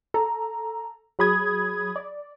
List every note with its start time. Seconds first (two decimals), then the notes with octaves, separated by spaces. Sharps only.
0.14 A4 A#5
1.19 F#3 G#4 B5 D#6 G#6
1.96 D5